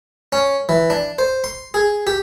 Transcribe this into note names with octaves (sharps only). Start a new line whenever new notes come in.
C#4
E3
D4
C5
C6
G#4
G4